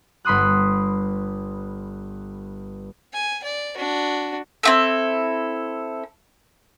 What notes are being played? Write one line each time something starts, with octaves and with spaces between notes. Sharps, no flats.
G1 B5 C6 D#6 F#6
G#5
D5
D4 F#4
C4 E4 A4